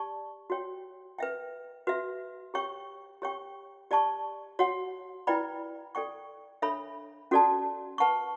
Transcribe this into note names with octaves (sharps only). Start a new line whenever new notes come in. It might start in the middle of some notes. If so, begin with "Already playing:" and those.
Already playing: G4 D5 A5 C#6
F#4 C#5 G5
B4 E5 G5
F#4 B4 E5
G4 C#5 G5 C#6
G4 C#5 G5 C#6
G4 D5 A5 C#6
F#4 C#5 F#5
E4 B4 D5 G5 B5
A4 D5 G5 C#6
D4 A4 C#5 E5 B5
C#4 F#4 A4 D5 A5
B4 F#5 A5 C#6